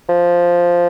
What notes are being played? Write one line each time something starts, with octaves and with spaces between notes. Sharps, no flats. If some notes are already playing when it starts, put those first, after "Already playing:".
F3